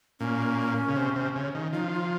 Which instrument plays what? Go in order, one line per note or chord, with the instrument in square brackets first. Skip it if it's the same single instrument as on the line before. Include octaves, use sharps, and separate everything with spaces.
[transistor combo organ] A#2 [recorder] C#4
[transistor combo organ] C#3
C3
C3
C#3
D#3
[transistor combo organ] F3 [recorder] D#4
[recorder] F4